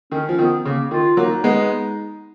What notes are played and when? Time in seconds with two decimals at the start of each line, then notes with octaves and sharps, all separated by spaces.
0.12 D#3 C#4
0.29 F3
0.38 D#3 B3
0.65 C#3 A#3
0.91 D#3 F4
1.17 F#3 A#3 D#4
1.44 G#3 B3